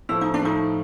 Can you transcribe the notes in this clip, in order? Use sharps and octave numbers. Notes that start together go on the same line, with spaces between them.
A2 F3 A3 E4
D#4
D4
A2 F3 A3 D#4